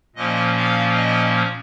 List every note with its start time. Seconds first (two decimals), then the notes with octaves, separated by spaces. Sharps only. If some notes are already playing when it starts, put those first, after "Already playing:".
0.16 A#2 F3 A#3 C#4 D#5
0.56 F5
0.95 D#5